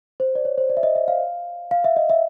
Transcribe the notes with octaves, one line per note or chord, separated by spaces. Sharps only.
C5
D5
C#5
C5
D5
E5
D#5
E5
F5
F5
E5
D#5
E5